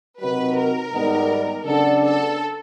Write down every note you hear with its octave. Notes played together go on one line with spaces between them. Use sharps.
C3 D#3 F#3 B4
A#4
G#2 D#3 G3 B3 D#4
C#3 F#3 B3 D4 A4
A4